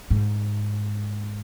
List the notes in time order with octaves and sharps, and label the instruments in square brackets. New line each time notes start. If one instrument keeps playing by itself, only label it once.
[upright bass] G#2